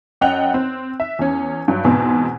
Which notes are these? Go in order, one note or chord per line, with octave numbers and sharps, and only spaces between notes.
F#2 D#5 F#5 G5 F#6 F7
C4
E5
E2 C#4
G2 F#3
E2 G#2 B2 C4